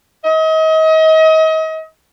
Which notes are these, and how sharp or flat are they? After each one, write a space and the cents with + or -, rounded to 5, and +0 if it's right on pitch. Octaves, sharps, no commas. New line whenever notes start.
D#5 +35